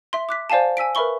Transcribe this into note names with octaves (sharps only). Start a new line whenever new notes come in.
E5 C6
D6 F#6 B6
C5 D5 F5 G#5 A5
G#5 E6 B6 D7
A#4 B4 E5 B5 C#6 G7